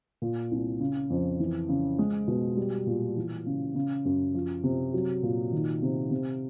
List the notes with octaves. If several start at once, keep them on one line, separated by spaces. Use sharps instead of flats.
A#2
C2
C#3
F2
E3
C#3
G#3
B2
G3
A#2
E3
C#3
C#3
F#2
F3
C3
F#3
A#2
D#3
C3
C3